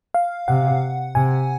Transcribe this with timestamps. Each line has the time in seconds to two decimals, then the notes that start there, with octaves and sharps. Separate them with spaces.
0.14 F5
0.48 C3 F#5
1.15 C3 G#5